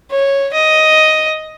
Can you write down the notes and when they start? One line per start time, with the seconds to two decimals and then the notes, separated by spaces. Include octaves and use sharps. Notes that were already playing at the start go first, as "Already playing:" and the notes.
0.11 C#5
0.53 D#5